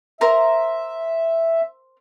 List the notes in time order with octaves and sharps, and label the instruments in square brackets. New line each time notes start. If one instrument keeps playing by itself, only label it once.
[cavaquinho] A#4 C5 A#5 [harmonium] E5